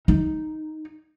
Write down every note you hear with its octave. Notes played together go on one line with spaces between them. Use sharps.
D#4